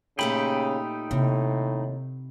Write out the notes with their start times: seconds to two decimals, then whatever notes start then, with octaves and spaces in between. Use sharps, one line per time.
0.19 A#2 C#3 A3 D#4 G4 G5 B5
1.11 D#2 A2 C3